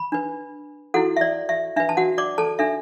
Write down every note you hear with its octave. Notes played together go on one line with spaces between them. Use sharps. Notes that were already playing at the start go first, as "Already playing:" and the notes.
Already playing: B5
D4 B4
E4 F#4 A4 F#5
E5
D5
E5
D4 B4 E5
A5
F#4 F#5
D5 D6
A4 A5
D4 A4 E5